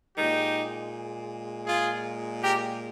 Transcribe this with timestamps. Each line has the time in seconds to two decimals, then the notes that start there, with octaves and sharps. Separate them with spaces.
0.17 A#2 G#3 D#4 G4
1.67 F4 G#4
2.42 G4 A#4